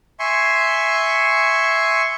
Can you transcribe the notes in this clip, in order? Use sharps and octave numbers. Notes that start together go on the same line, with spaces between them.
E5 G#5 C6 C#6